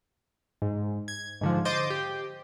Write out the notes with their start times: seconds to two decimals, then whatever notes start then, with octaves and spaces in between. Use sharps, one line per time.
0.62 G#2
1.08 G#6
1.41 G#2 D3 F3
1.65 C5 D#5 C6 D6 G6 A6
1.90 G4